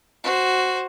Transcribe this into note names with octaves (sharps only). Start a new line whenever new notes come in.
F#4 C5